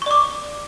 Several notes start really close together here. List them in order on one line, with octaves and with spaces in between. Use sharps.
C#6 D5 D6